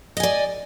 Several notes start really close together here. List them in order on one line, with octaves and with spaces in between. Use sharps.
D#5 G#5 D5